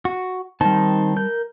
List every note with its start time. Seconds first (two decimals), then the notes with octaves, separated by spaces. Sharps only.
0.05 F#4
0.61 D#3 G3 C4 D#4 A5
1.16 A#4 G6